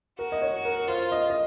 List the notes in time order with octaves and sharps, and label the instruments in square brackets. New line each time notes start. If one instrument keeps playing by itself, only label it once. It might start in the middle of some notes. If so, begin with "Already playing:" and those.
[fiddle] F#4 [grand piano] A#4
[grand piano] D#5
C#5
[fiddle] F#4
[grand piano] A#4
[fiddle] F4 [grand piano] C5
[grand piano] D#5
D#5